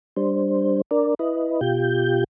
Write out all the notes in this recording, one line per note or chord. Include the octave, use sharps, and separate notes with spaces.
G3 D4 C5
D4 A#4 D5
E4 B4 D#5
B2 F4 G4 G6